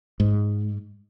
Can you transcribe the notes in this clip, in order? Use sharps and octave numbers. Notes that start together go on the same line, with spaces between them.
G#2